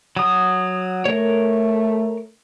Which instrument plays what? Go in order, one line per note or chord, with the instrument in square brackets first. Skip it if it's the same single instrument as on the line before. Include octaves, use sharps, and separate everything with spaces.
[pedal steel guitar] F#3 D#6
[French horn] A3 [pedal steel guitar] A#4 C#5